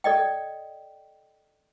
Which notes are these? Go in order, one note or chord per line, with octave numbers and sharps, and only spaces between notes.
A4 D5 D#5 G5